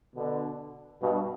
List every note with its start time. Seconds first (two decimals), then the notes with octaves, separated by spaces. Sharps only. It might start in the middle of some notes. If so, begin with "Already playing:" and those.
0.14 B2 D3
1.00 G2 B2